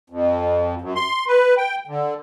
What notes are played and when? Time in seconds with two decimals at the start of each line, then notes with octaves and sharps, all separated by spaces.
0.10 F2
0.81 F#2
0.95 C6
1.27 B4
1.58 G5
1.87 D3